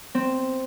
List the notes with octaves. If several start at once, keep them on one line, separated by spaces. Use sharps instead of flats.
C4